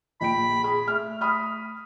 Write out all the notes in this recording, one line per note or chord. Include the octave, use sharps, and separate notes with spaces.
A#1 G5 B5 D7
G#4 B5
A3 F6
B5 D#6 F6